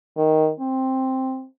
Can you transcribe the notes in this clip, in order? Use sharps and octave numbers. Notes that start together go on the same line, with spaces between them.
D#3
C4